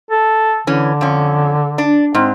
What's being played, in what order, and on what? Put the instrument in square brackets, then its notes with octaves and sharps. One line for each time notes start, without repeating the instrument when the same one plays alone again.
[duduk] A4
[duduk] D3 [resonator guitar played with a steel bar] E3 C#4
[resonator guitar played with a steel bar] F2 C#4
D4
[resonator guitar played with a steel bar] G#2 [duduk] C4